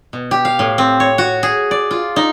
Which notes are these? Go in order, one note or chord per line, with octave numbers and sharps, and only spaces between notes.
B2
G4
F5
A2
C4
C#5
F#4
G#4
D5
F4
D#4